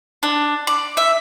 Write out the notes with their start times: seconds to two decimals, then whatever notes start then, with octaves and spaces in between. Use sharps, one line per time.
0.23 D4
0.67 D5
0.97 E5